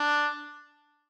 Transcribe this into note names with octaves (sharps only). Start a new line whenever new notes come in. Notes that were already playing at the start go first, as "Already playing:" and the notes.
Already playing: D4